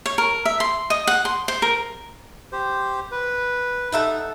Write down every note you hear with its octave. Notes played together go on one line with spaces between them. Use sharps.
C#5
A#4
E5
C6
D#5
F#5
C6
C5
A#4
G4 C5
B4
D#4 A4 E5 F#5